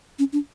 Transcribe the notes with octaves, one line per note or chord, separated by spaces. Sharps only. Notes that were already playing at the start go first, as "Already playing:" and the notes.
C#4
D4